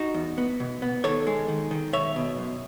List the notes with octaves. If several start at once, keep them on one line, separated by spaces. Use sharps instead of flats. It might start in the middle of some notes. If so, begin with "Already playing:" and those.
Already playing: D#4 F#4
E2
B3
B2
B3
D#3 A4 C#5
G#3
D#3
D#3
B1 C#5 E5
B2
F#2